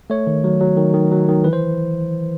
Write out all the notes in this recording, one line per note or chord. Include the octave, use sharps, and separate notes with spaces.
A3 C#5
D#3
F#3
F#3
D#3
D#3
F#3
D#3
E3 B4
C5